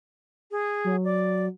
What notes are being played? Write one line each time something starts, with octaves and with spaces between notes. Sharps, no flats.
G#4
F#3
D5